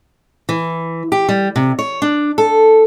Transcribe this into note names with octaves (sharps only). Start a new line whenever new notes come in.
E3
G4
G3
C3
C#5
D4
A4